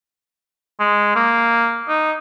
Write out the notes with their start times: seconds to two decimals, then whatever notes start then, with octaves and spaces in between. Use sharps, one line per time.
0.80 G#3
1.16 A#3
1.88 D#4